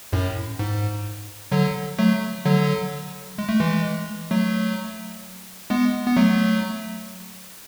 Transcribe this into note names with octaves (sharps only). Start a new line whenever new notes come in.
F#2 A2
G#2
D3 F#3
F#3 A3
D3 F#3
G#3
A3
E3 G#3
F#3 A3
G#3 B3
B3
F#3 A3